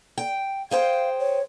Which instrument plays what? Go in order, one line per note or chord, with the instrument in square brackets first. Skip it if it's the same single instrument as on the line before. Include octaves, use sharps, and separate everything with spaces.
[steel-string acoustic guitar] G5
[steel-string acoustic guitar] G#4 C5 G5 [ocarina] F5
[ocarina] C#5